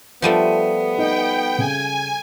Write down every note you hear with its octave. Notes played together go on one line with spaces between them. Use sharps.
F3 G3 A3 B3 F4 D#7
D#4 D#5 G5
C#3 G#5